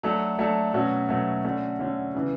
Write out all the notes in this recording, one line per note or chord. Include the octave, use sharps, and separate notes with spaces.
F#3 A3 D4 A4
F#3 A3 D4 A4
B2 F#3 A3 C#4 F#4
B2 F#3 A3 C#4 F#4
D3 A3 C#4 F#4
D3 A3 C#4 F#4
C#3 E3 B3